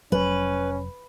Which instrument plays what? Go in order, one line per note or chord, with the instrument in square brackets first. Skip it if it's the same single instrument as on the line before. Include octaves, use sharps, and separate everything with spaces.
[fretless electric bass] F1 F#3 [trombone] C#4 [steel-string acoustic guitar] B4